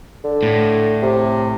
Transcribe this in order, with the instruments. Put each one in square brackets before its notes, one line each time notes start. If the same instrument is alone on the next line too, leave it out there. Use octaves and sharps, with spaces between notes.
[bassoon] D3
[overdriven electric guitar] A2
[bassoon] C3